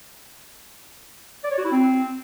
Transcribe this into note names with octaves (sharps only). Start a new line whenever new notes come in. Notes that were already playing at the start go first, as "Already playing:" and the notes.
D5
C#5
F#4
E4
C4